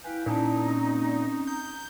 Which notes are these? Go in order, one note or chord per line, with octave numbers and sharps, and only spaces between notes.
E4 B4 F5 G5 G#5
A#2 C#4 D#4 E4 A5
C4 C#4
A#5 G6